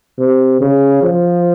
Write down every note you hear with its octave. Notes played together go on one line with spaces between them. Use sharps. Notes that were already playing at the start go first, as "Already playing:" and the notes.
C3
C#3
F3